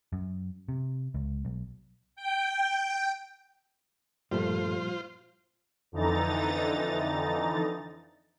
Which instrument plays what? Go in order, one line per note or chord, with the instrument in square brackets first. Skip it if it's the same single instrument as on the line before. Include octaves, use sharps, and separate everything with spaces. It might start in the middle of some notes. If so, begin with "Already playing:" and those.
[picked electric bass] F#2
C3
C#2
B1
[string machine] G5
[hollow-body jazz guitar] G2 A3 [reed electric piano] A#2 F3 G3 [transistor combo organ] F4 C5
[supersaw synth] F2 D3 E3 D#4 A#5 A6